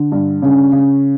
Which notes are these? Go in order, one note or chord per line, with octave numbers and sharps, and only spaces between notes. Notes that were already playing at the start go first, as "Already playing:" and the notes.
Already playing: D3
G2
C#3
C#3